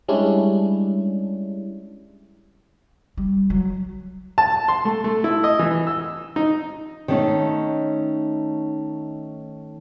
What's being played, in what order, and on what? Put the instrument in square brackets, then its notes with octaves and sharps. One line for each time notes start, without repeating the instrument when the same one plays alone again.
[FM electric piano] G3 G#3 C#4 D4 E4
[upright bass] G3
F#3
[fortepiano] A5
C6
A3
A3
E4
D#5
E3
E6
D#4
[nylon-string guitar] D#3 G3 A3 C#4 D#4 C#5